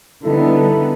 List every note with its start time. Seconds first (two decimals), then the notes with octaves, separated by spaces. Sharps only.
0.24 D3 G3 B3 D#4 E4 A4